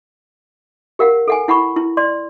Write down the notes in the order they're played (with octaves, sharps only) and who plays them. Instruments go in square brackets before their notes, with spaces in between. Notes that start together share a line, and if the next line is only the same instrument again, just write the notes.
[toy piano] G4 A#4 F5 F#5
A4 F#5 G#5
E4 F#5 B5 C#6
E4
D5 C6